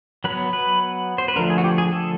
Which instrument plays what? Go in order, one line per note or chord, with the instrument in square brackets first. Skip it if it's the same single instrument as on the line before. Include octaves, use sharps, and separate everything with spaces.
[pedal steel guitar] F#3 B4
B3
B4
C5
B4
D3 F3 A3 A#4
G#4
F#4
G4
G#4
A4